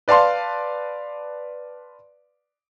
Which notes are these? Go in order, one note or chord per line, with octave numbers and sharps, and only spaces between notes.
B4 D5 F5 A5 C6